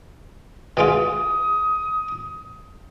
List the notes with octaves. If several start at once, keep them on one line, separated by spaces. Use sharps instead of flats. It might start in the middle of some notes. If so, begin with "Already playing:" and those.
B2 G#3 F4 D#6